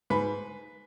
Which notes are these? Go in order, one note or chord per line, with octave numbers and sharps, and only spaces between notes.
G#2 B4